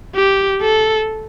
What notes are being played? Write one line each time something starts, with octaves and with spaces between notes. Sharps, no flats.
G4
A4